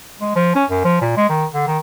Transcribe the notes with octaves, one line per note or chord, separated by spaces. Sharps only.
G#3
F3
C#4
F#2
F3
A#2
G#3
D#3
D3
D#3